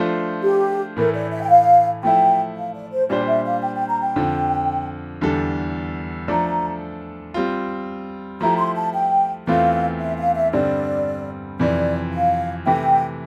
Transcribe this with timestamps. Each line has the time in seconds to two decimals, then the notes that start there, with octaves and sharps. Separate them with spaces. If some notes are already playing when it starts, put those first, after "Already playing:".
Already playing: F3 A3 D4 F4 C5
0.43 G4
0.97 A2 E3 A3 A#4
1.14 D5
1.32 E5
1.42 G5
1.49 F5
2.03 F3 A3 E4 G5
2.56 F5
2.74 D5
2.91 C5
3.09 A#2 G3 D4 G4 C5 D5
3.27 E5
3.45 F5
3.63 G5
3.76 G5
3.89 A#5
4.02 G5
4.16 F2 D3 F3
5.21 E2 D3 G3 D4 A4
6.28 F3 A3 D4 A4 D5 A#5
7.34 G3 C4 F4
8.41 F3 A3 E4 G4 A#5
8.58 C6
8.76 A5
8.94 G5
9.47 E2 E3 A3 C4 F4 F5
10.00 E5
10.18 F5
10.36 E5
10.53 G2 D3 G3 C4 D5
11.59 F2 C3 E3 D5
12.13 F5
12.66 C3 E3 A3 E4 G5